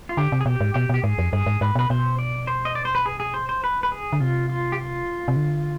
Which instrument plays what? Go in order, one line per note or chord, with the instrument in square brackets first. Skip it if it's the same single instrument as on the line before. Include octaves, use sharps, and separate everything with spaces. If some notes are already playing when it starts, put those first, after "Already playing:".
[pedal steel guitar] F4
[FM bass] D3 [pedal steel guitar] G4
[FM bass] C3
[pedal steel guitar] G#4
[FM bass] B2 [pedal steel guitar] G4
[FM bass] G#2
[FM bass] B2 [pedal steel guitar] G4
[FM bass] B2 [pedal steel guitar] G4
[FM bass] G#2 [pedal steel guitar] G#4
[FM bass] F2
[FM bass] G2 [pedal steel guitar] G#4
[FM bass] G#2
[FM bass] G#2 [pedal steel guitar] B4
[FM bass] B2 [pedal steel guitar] B4
[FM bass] B2 [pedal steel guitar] C5
[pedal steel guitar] D5
C5
D#5
D5
C5
B4
G#4
G#4
C5
C5
B4
B4
G#4
[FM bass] D3
[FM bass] C3 [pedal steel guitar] F4
[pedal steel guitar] F4
G4
F4
[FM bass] C3
D3